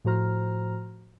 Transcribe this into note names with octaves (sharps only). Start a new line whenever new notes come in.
A2 F3 F#4 C5 A#5 F6